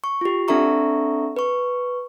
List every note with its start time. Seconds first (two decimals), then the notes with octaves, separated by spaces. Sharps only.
0.04 C#6
0.21 F4 G4
0.48 C4 D4 A4 E5 A#5 C#6
1.36 B4 C#6